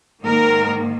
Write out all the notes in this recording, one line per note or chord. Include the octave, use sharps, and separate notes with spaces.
G#2 D#3 A#3 A#4